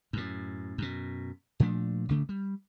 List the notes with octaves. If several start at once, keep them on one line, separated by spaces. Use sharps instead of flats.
F#2 A2
F#2 B2
A#2 F3 A3 D4
A1 C#3 A3
G3